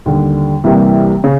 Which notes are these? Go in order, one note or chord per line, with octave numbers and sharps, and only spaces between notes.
D#2 D3 G3
C2 C3 E3 G3 A#3
C#3